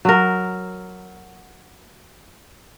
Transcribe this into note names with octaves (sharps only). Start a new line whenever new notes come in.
F#3 A#4